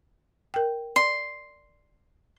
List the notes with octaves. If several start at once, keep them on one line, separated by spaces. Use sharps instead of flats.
A#4 G5
D5 C6